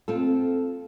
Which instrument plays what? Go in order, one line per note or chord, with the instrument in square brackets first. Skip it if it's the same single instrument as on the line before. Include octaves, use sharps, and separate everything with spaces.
[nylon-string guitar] C4 F4 A4